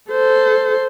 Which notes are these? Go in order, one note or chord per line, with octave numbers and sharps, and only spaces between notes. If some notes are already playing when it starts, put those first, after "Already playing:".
A4 C5